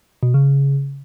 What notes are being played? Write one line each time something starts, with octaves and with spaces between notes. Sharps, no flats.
B2
C#3